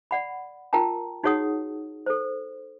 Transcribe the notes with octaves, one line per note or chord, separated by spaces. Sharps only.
D5 F#5 B5
F4 A#4 G5 A5 A#5
D#4 F#4 G#4 C#5 F#5 D#6
A4 C5